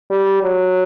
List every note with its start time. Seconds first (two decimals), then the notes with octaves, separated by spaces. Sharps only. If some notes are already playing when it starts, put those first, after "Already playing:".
0.10 G3
0.43 F#3